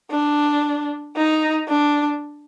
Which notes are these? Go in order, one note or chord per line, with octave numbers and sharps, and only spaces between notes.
D4
D#4
D4